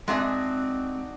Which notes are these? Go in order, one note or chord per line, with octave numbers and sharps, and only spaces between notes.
G#3 C4 D4 D#4 F#4 G#4 E5